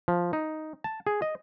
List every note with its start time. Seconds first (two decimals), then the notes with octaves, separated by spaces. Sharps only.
0.08 F3
0.33 D#4
0.84 A5
1.07 G#4
1.22 D#5